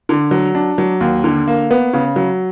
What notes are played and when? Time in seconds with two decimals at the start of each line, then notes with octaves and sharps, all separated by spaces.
0.09 D3
0.31 F#3
0.55 D4
0.78 F#3
1.01 D#2
1.24 D3
1.47 A#3
1.71 B3
1.93 C#3
2.16 F#3